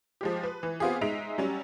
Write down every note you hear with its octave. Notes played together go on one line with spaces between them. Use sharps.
F3 G#3 G4
B4
E3
B3 C4 F4 G4 G#4
G#3 D#4 E5 D7 F7
F#3 G3 C#4